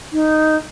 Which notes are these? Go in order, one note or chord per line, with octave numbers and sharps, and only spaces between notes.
D#4